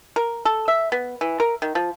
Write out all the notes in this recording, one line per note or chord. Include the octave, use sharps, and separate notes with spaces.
A#4
A4
E5
B3
E3
A#4
D#3
F3